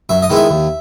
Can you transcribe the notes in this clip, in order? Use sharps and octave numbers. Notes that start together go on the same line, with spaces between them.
F#2 E5
D#5
D#3 G#3 B3 E4
E5
D#2